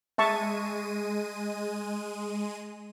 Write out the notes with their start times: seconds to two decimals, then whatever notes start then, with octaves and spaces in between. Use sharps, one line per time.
0.18 G#3 E5 A5 C#6 D#7